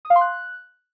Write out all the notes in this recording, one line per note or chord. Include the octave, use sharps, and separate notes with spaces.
D#6
F5
C6
F#6